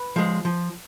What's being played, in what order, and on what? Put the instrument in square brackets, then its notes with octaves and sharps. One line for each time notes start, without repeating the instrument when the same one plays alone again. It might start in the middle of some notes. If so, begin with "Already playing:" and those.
Already playing: [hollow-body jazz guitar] B4
F3 G#3
F3